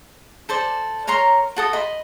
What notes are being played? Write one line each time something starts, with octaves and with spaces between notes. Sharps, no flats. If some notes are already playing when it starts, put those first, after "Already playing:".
A4 C5 D5
A#4 C#5 A#5 C6
F#4 A4 D#6
D#5 B5 C6